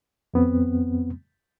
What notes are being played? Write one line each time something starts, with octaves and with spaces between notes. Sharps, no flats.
F2 B3 C4